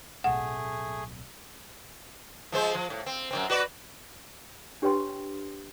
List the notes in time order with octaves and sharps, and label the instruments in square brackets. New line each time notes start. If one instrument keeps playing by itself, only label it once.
[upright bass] D1 B1 [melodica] A3 G#4 [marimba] F#5
[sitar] F3 G#3 C5
F3
A2
C4
F#2 C#3 C4
F#4 B4 D5
[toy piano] D4 G4 B4 C#5 G5 C6